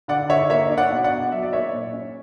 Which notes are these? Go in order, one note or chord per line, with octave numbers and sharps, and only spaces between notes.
D3 D5 F#5
D3 C#5 E5
A#3 C#5 E5
D4
D5 F#5
B2
D5 F#5
B2
F#3 E5
D5
A#3 C#5 E5
A#2
C#4